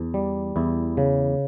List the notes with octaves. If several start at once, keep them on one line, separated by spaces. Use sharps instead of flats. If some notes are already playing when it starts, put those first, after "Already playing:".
Already playing: E2
G3
E2 E4
C#3